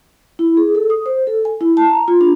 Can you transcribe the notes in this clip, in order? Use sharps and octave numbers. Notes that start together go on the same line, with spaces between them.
E4
G#4
A4
D#6
C5
A4
G#5
E4
A5
A#5
F4
D4